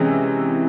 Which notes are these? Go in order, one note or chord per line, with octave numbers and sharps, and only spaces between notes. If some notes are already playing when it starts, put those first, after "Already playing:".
Already playing: C3 E3 G#3 C#4